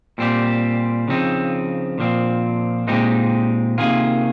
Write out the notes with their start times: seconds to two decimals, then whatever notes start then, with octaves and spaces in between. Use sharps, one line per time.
0.18 A#2 G3 C4 G4
1.08 C#3 F3 C4 D#4
1.98 A#2 F3 C4
2.87 A#2 G#3 C4 D#4 G4
3.78 C3 D#3 A#3 F4 G#4